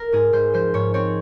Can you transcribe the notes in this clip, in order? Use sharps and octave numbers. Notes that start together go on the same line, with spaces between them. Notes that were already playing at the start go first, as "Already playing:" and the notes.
Already playing: A#4
G#2 G#4
G#2 C5
F3 C5
G#2 C#5
C4 C#5